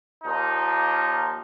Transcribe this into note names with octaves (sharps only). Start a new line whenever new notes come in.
D#2 A#2 F3 D#4